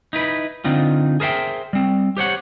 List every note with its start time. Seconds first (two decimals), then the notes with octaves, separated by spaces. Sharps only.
0.13 D#4 E4 B4
0.64 D3 C4 D#4 F4
1.20 G#4 A#4 C5 E5 G5
1.73 G3 C4
2.17 G4 C5 C#5 F#5